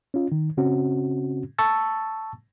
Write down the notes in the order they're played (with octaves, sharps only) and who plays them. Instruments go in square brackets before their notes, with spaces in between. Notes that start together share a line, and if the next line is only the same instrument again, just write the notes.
[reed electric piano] C#4 F4
D#3
C#3 C4 C#4 F#4
A5 C#6 E6 A6